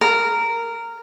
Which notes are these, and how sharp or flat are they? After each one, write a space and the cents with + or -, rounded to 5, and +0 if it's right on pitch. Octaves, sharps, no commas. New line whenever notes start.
A#4 -10